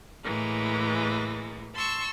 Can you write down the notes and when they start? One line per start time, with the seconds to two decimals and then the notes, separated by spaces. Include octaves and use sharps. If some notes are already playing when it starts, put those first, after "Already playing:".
0.23 A2 E3 G#3 A#3
1.75 A5 C6 C#6 E6